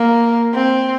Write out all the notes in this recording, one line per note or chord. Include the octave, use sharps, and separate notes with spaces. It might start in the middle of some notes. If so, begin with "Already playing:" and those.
Already playing: A#3
C4